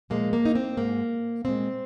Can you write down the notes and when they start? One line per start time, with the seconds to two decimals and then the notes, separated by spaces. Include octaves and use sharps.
0.10 A#2 F3 G#3 A#3
0.33 A#3
0.45 D#4
0.55 C4
0.77 G#2 G#3 A#3
1.44 A#2 G#3 C4